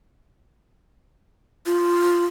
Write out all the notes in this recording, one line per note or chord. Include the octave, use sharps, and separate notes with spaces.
F4